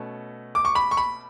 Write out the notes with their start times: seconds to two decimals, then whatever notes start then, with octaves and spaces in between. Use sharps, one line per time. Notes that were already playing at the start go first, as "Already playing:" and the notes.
Already playing: B2 A3 C#4
0.55 D6
0.65 C#6
0.75 B5
0.91 C#6
0.97 B5